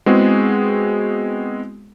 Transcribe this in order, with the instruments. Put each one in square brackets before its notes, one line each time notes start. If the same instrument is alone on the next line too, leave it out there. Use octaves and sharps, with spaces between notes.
[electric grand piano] G#3 B3 C4 E4 F#4 G#4